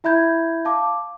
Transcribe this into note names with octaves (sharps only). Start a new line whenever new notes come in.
E4 E5 B5 G6 G#6
F5 A5 D6